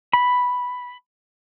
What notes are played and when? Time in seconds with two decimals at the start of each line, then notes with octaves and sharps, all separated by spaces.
0.13 B5